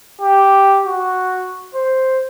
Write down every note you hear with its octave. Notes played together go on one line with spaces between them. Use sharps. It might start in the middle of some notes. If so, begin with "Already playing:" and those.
G4
F#4
C5